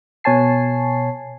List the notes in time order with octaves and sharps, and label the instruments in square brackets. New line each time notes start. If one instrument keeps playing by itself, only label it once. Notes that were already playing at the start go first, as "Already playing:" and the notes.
[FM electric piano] B2 C#5 G#5 A5 C7